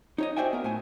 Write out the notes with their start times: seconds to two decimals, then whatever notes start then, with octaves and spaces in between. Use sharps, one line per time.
0.18 D#4 C#5 D#5
0.37 F#4 C5 D5 E5 G5 G#5
0.53 B3 A#4
0.64 A2 G#5